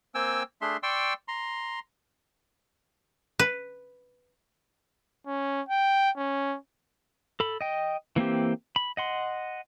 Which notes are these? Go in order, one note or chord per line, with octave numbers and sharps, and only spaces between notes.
A#3 C4 G5 G#5 E6
A3 D4 G#4 E5 C6
D5 G5 C6 C#6 E6
A#5 C6
B4
C#4
G5
C#4
A4 B5
D#5 G5
E3 A#3 C4 G4
B5
D#5 F#5 C6